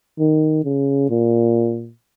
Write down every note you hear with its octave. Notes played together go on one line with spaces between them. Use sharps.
D#3
C#3
A#2